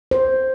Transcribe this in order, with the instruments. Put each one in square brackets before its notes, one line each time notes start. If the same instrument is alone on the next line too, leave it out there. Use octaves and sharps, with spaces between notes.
[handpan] C5